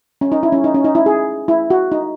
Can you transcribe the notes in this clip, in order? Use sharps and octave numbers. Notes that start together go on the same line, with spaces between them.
C#4
D#4
E4
C#4
D#4
C#4
D#4
E4
G#4
E4
F#4
D#4